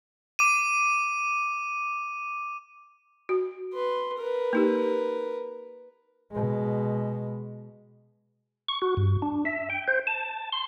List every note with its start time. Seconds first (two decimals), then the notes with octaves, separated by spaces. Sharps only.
0.39 D6 D#7
3.29 F#4
3.73 B4 C6
4.18 A#4 B4
4.53 A#3 D#4 G4
6.32 B2 G#3
8.69 C#6
8.82 F#4
8.97 G2
9.22 D4
9.45 E5
9.70 G5
9.88 C5
10.07 A5
10.52 C6